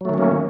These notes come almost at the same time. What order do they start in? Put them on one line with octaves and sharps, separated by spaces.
F#3 A3 D#3 C#4 A#3